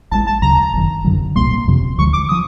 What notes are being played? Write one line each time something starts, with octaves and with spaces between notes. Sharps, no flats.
A1 A2 E3 G#3 A5
A5
D2 C#3 F#3 A#5
G1 F#2 D#3
G#1 F#2 D3 F#3
C2 A#2 G3 A#3 C6
F#1 F2 C3 F3
D2 D3 F3 G#3 C#6
D6
F3 D#6